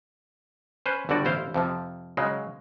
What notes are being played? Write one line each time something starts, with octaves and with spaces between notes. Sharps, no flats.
C#4 B4 C5
G1 D3 G3 F#4 D5
A1 E4 C5 F5
F2 C3 F3
C#3 F#3 G#3